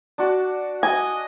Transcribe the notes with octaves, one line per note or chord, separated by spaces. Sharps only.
D4 F#4 A5
D#5 G#5